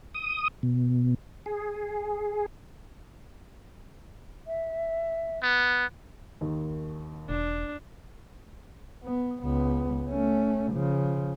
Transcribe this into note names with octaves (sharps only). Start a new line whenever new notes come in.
D#6
B2
G#4
E5
B3
D#2 D#3
E1 D4
B3
C#2 B3
A3 C#4
C#3 F3